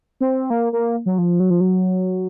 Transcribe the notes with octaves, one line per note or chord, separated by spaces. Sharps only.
C4
A#3
A#3
F#3
F3
F#3
F3
F#3